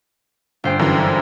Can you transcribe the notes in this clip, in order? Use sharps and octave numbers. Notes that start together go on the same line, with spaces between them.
G1 C5 G5
F#2 D3 E3